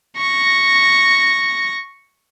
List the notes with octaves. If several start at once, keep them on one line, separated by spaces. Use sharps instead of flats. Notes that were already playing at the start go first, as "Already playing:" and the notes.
C#6 A#6